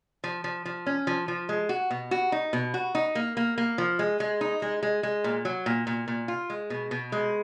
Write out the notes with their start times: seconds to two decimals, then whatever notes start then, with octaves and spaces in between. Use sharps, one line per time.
0.24 F3
0.44 F3
0.65 F3
0.86 C#4
1.07 F3
1.28 F3
1.49 G#3
1.69 F#4
1.91 B2
2.11 F#4
2.32 D#4
2.53 B2
2.74 F#4
2.95 D#4
3.15 A#3
3.37 A#3
3.58 A#3
3.78 F3
3.99 G#3
4.20 G#3
4.41 D#4
4.62 G#3
4.83 G#3
5.03 G#3
5.24 A#2
5.45 F#3
5.66 A#2
5.87 A#2
6.08 A#2
6.28 F4
6.50 G#3
6.70 B2
6.91 B2
7.12 G#3